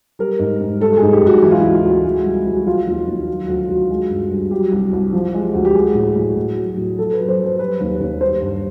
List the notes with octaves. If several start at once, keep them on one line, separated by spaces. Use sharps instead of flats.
G3 A#4
G#2
G#2
G3 A4
G#4
G#2
G4
G#2 F#4
E3 E4
F4
D2 E4
D2
G#3
C2
C2
F#4
F3 F4
D#2
D#2
F#3
D2
D2
G#3
G2
G2
F#3 G4
C2
C2
F3
G#3
D2
G4
G#3 G#4
A2
A2
A2
F#3
A2
F3 A4
B4
F#2
C5
F#2
C5
G3 B4
D#2
D#2
G3 C5
G2